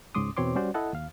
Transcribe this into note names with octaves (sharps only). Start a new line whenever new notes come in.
C#2 G#2 C#4 C6 D6 D#6
E2 B2 C4 C#5 C6 D6
G3 C#4 F#4 C5 D5
E4 A4 D#5 F#5 A5
D#2 F5